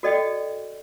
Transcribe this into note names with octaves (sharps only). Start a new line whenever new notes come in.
F#4 A4 D5 D#5 G5